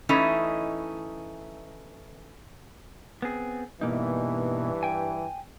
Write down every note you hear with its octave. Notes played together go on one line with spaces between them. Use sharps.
E3 A3 C#4 D#4 E4 D#5
B3 C4 G#4
G2 B2 E3 A#3 D#4
G5 G#5